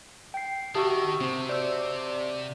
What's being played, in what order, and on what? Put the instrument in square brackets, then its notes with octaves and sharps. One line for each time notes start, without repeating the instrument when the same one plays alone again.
[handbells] G5 C7
[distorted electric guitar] D#3 [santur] F#4 E5 A5 [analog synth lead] G4 [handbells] C#6 D#6
[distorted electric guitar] C3 [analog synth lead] C4
[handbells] C5 E6 [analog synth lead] D5